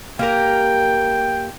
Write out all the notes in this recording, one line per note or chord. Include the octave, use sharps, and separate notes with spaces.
A#3 G4 A#4 G5